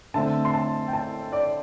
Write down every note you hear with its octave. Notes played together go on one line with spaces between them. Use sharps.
D3 A3 C4 A5
C6
A5
G5
A5
D5